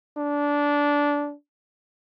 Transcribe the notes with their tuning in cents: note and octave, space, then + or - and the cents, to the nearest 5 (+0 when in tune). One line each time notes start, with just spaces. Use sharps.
D4 -15